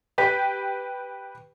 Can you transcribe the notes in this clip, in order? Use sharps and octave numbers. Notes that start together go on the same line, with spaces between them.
G4 B4 G5 B6